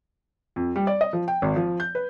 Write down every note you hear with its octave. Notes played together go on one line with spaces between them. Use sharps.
F2
G3
D5
D#5
F3
G5
G#1
F3
G6
B4